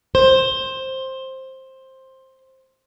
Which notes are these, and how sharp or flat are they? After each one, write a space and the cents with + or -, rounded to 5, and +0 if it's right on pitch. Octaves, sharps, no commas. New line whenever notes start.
C5 +10